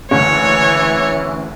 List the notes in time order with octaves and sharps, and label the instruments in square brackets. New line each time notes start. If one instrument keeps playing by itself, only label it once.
[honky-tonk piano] F#1 D2 [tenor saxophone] E3 [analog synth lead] C#4 [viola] C#5